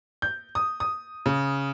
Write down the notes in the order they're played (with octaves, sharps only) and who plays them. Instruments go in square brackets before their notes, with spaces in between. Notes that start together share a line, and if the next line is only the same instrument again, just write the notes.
[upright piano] G6
D#6
D#6
C#3